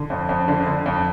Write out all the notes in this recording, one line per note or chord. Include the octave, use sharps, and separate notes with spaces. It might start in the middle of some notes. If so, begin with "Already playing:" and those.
Already playing: D3
F2
F2
D3
D3
F2